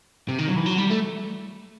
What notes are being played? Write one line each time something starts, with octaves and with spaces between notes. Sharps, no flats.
C3
D#3
F#3
E3
F#3
G3
A3